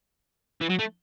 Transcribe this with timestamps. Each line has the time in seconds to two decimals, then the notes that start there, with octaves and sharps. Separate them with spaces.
0.61 E3
0.70 F#3
0.79 A3